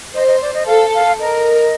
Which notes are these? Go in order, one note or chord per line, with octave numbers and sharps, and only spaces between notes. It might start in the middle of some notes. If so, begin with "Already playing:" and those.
C5 D#5
D#5
D5
D#5
A4 F5
F5
A#4 D#5